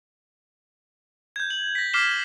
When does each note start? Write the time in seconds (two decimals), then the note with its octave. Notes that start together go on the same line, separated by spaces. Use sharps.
1.36 G6 G#6
1.50 F#7
1.75 A#6 B6
1.93 D6 F6 B6 C7 E7 G7